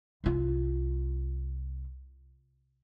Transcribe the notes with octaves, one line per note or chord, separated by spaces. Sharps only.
C2 F4